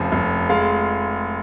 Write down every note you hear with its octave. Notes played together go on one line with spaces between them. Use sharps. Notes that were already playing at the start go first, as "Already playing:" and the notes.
Already playing: F1 C#3 F3
F1
G#3 F5